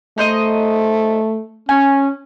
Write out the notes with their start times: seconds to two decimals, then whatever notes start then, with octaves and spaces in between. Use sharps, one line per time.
0.18 A3 D#4 C5 D#5
1.69 C#4 G#5